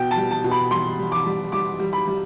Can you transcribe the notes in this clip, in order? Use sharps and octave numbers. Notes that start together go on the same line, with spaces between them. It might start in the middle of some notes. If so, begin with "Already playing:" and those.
Already playing: B2 G5
A5
G3
A5
B2
B5
G3 C6
G3
D6
G3
G3 D6
G3
B5
G3